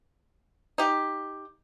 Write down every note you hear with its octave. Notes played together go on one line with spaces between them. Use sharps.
D#4 G4